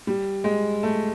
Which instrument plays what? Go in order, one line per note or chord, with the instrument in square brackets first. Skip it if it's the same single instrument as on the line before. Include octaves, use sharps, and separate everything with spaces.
[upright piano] G3
G#3
A3